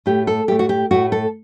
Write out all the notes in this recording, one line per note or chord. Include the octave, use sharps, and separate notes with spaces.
A2 A3 G4
A4
A2 A3 G4
F#4
G4
A2 A3 F#4
A4